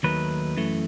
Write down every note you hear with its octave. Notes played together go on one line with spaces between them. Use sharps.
D#2 D#3 F#3 A3 D#4 B4
F#2 E3 A3